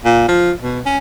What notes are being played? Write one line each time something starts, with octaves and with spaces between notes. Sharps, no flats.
A#2
F3
B2
C#4